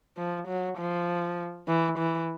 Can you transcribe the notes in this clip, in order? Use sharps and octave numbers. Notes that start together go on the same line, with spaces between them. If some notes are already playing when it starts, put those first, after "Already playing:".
F3
F#3
F3
E3
E3